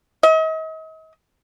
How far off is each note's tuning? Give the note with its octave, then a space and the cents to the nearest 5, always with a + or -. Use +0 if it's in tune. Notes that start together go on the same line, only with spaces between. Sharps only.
D#5 +40